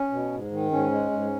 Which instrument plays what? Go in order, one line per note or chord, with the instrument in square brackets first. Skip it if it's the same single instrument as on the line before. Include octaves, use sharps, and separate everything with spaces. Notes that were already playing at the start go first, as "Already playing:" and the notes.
Already playing: [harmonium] C#4
B2
G#2
D#3
G#2 C#4
G#3
G#2